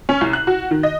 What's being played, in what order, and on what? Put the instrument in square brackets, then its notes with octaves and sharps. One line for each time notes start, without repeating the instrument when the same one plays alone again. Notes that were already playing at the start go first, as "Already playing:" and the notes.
[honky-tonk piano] C#4
C2
F#6
F#4
D#3
D#5